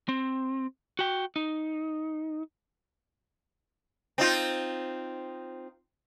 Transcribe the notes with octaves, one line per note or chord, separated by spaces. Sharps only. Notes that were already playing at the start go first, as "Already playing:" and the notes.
C4
F#4 G5
D#4
C4 D#4 F4